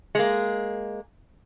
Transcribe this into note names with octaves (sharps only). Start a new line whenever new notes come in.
G#3 A#3